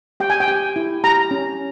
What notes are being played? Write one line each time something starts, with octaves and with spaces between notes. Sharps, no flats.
G4 G5
G#5
G5
G4
E4
G4 A#5
C#4